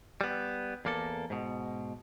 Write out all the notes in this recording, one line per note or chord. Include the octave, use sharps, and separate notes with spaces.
G3 B3
E2 A#3 A4
G#2 B2